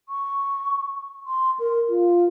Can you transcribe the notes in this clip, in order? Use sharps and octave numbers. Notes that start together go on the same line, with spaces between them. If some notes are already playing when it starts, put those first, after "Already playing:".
C#6
C6
A#4
F4